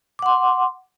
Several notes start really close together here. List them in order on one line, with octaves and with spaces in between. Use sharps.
D6 F#5 C6